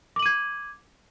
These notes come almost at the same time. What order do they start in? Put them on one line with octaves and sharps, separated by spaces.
D6 F#7 D#7 G#6